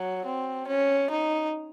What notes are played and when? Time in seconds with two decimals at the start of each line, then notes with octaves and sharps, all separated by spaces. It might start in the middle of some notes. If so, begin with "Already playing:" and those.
Already playing: F#3
0.25 C4
0.68 C#4
1.10 D#4